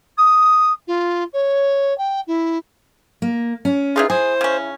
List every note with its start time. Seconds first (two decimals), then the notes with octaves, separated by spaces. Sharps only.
0.17 D#6
0.87 F4
1.33 C#5
1.98 G5
2.27 E4
3.22 A#3
3.65 C#4
3.96 E3 D#4 F4 G#4
4.10 E4 G#4 C5
4.41 C#3 C#4